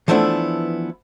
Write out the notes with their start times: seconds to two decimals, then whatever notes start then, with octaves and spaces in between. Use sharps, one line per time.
0.08 E3 F3 A3 B3 D4 E4